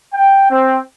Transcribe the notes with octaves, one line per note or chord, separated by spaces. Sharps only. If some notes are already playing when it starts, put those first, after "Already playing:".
G5
C4